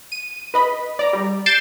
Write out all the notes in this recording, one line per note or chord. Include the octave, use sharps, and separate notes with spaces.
D#7
B4 D#5 B5
D5 A#5
G3
G6 A6 C7 D7 E7